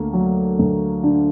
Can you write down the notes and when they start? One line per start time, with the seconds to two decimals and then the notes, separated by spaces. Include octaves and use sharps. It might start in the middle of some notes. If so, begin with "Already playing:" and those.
Already playing: D2 A#3
0.13 F#3
0.59 D2
1.03 D3